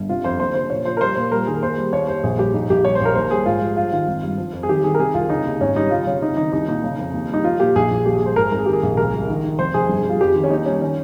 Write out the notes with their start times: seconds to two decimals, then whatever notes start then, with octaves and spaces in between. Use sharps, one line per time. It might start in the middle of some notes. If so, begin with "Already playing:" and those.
Already playing: G1
0.09 C3 F4
0.24 F2 C5
0.40 D#2 C5
0.55 C#3 C5
0.70 A#2 C#5
0.85 F3 C5
0.97 A#4
1.01 G3 C5
1.16 A#2 C5
1.32 G3 A#4
1.47 D#3 G#4
1.63 D#2 C5
1.78 G3
1.93 D#2 C#5
2.08 D#2 C5
2.23 A#1 G#4
2.38 G3 G4
2.54 A#1 D#4
2.70 A#1 G4
2.85 G3 C#5
2.95 C5
3.01 A#1 A#4
3.15 D#2 C5
3.31 G3 G#4
3.46 G#2 F4
3.61 F3
3.76 G3 F4
3.92 D#3 F4
4.08 G#1
4.23 G2
4.38 F3
4.53 F2
4.63 G#4
4.68 D#3 G4
4.84 D#3 G#4
4.94 A#4
4.99 C3 G#4
5.14 C2 F4
5.29 C#3 D#4
5.45 D#2
5.60 G#1 C#4
5.76 G3 D#4
5.91 C#3 F4
6.07 C#3 C#4
6.22 C3 D#4
6.37 D#3 D#4
6.52 C2 D#4
6.68 A#2 D#4
6.84 C#3
6.99 F2
7.14 D#2
7.29 G3 D#4
7.44 F3 F4
7.60 A#2 G4
7.75 A#1 G#4
7.91 A#1
8.06 D#2 G4
8.15 G#4
8.21 G3 C5
8.36 G#2 A#4
8.52 G#1 A#4
8.59 G#4
8.66 D#3 G4
8.73 G#4
8.83 A#1
8.97 C#2 A#4
9.12 G3
9.29 D#3
9.43 D#3
9.59 F1 C5
9.74 F1 G#4
9.89 G1
10.05 G3 F4
10.21 F2 G4
10.35 D#3
10.44 C#4
10.50 D#2 D#4
10.66 G3 C#4
10.82 D#3 C#4